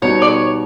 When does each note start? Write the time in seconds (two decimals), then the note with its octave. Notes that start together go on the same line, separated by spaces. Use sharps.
0.02 B2 G3 B3 D#4 C#5
0.22 D5
0.28 C#5